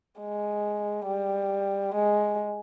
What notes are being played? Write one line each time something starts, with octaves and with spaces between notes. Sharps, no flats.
G#3
G3
G#3